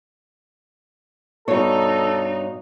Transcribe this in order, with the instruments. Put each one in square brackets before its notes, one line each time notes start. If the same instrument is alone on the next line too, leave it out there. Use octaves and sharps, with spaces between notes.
[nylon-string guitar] G2 C#5 [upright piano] B2 [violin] D#4 [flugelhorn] A4